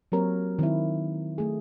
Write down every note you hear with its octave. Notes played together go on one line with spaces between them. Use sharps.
F#3 A#3 C4 G4 A#4 C#5
D#3 C4 E4
A3 G#4